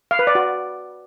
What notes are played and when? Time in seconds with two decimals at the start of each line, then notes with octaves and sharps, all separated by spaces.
0.11 F5
0.19 B4
0.27 D5
0.35 F#4